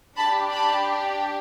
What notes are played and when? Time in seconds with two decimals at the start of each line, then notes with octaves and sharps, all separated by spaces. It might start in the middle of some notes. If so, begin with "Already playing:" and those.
0.16 D4 G4 A5 B5
0.51 A5 B5